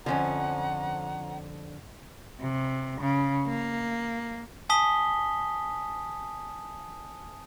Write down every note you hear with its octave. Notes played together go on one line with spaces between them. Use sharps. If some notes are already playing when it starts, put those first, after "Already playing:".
F2 G#2 D3 F3 C#4 F#5 A#5
C3
C#3
A#3
G#5 A5 D#6 B6 G7